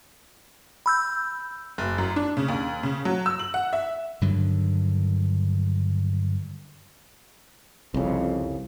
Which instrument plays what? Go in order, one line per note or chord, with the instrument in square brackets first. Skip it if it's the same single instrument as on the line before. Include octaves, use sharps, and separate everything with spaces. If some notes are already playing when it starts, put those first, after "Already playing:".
[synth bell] B5 E6 G6
[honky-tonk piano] F#1
F#2
D4
C#3
D#2
C#3
F#3
E6
F#7
F#5
E5
[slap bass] G2 D3 D#3 F#3
[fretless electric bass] C2 C#3 [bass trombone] F2